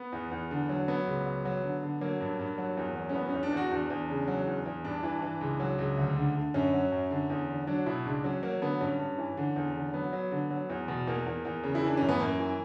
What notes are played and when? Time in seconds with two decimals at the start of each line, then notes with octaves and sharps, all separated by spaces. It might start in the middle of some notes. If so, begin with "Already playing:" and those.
Already playing: B3
0.12 E2
0.31 E2
0.51 D3
0.69 F#3
0.88 F#3 B3
1.07 C#2
1.26 F#3
1.45 F#3
1.64 D3
1.83 D3
2.01 F#3 A#3
2.21 G2
2.39 G2
2.58 F#3
2.77 E2
2.96 F#3
3.09 C#4
3.15 E2 B3
3.29 C#4
3.34 E2
3.43 D4
3.52 E2 F#4
3.71 E2 D4
3.90 E2
4.09 C#3
4.28 F#3
4.47 E2
4.65 E2
4.84 G2 D4
5.03 E3
5.22 E3
5.41 C#2
5.60 F#3
5.79 C#2
5.97 D2
6.16 D3
6.36 D3
6.54 F#2 C#4
6.73 F#3
6.92 F#2
7.11 D3
7.30 E2
7.49 D3
7.67 F#3 D4
7.86 B2 E4
8.05 C#2 D4
8.24 F#3 C#4
8.43 F#3 A#3
8.61 D3 B3
8.81 G2 C#4
8.99 G2
9.18 E3
9.37 D3
9.56 E2
9.75 D3
9.94 F#3 B3
10.13 F#3
10.31 D3
10.51 F#3
10.69 E2
10.88 B2
11.07 E2 A#3
11.26 E2
11.45 E2
11.63 C#3
11.75 E4
11.83 E3 D4
11.97 F#2 C#4
12.09 B3
12.20 F#2 A#3
12.39 E3